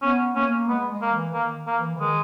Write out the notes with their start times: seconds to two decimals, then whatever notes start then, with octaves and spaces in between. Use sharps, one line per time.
0.02 B3 C#4
0.35 A#3 C#4
0.68 G#3 B3
0.90 G#3
1.02 A#3
1.12 E3
1.34 D#3 A#3
1.67 A#3
1.78 E3
1.95 E3
1.99 D#3 G#3